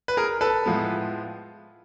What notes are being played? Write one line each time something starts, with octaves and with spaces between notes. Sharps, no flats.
B4
G#4 A#4
A4 B4
A2 F3 G#3 B3